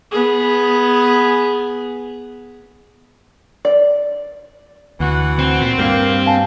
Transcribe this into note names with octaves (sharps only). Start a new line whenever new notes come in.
B3 G#4
D5
D2 E3 F#4 F#5
C4
A#2
G2 G3 A#3
F5 G#5 A5